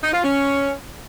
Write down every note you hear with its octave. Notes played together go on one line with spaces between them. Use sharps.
D#4
F4
C#4